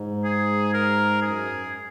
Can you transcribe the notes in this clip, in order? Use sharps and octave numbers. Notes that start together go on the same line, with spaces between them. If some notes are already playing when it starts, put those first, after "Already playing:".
Already playing: G#2
G#4
A#4
F#2 G#4